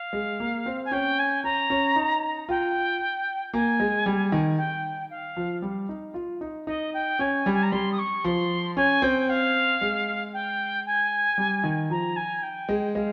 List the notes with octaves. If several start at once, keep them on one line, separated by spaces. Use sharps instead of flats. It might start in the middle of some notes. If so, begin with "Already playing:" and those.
Already playing: F5
G#3
A#3
C4
G#5
C#4 G5
G#5
C#4 A#5
C#4
D#4
F4 G5
A#3 G#5
G#3
G3
D#3
G5
F5
F3
G3
D#4
F4
D#4
D#4 D#5
G5
C#4 G#5
G3
G#5
A#5
G3 C6
D#6
C#6
F3 C6
C#4 G#5
C4 G5
F5
G#3
G5
G#5
G3
D#3
F3 A#5
G#5
G5
G#3
G#3 F5